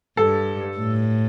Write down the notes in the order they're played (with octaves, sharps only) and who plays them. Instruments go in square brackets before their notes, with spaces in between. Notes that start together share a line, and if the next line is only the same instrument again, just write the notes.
[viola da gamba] G2 [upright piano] A4
[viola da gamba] A2